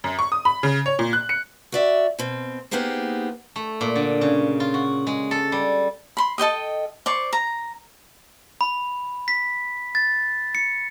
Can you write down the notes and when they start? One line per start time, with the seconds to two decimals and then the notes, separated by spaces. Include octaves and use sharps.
0.04 F#2
0.19 C#6
0.32 D#6
0.45 B5
0.63 C#3
0.86 C#5
0.99 A#2
1.13 F#6
1.29 C#7
1.72 F#4 D5 E5
2.19 B2 C4
2.71 A#3 B3 D#4 G4 G#4 C5
3.56 A3
3.81 A#2
3.96 D3
4.21 C#3
4.60 F4
4.74 F#4
5.07 G#3
5.31 A4
5.52 G3
6.17 B5 C6
6.38 A4 D#5 G5 D#6
7.06 C5 D5 C#6
7.33 A#5
8.61 B5
9.28 B6
9.95 A6
10.55 C#7